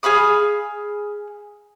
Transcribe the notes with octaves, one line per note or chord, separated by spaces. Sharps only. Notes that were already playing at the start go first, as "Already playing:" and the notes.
G#4 F5 B5 D#6